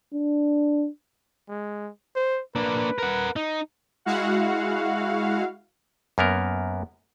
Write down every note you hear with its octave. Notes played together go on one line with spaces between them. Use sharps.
D4
G#3
C5
A#3 D4 B4
A#4 F#5
D#4
G#3 E4 F#4 F5 F#5
F#2 A#3 B3 A#4